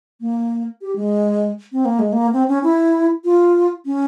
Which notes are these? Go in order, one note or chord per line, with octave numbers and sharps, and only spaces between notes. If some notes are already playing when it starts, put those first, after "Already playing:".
A#3
G4
G#3
C4
A#3
G#3
A#3
C4
C#4
E4
F4
C#4